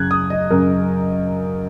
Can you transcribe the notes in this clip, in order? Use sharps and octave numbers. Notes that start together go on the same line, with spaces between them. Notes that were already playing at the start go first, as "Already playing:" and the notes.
Already playing: F#2 C#3 F#6 G#6
D#6
D#5
F#2 C#3 A#4